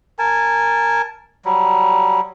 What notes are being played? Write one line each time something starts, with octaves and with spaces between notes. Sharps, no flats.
A#4 G#5 A5
F#3 G3